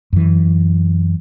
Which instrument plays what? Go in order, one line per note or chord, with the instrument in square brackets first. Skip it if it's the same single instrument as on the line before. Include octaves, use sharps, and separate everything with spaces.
[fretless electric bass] F#2 E3